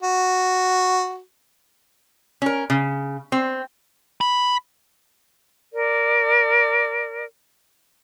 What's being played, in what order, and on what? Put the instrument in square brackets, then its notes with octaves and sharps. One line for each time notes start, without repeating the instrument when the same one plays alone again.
[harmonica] F#4
[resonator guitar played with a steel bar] C#4 A#4
C#3
C4
[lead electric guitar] B5
[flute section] A#4 D5